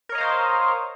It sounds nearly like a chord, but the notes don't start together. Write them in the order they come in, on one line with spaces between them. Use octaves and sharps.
A#4 C#5 D#5 F5 C5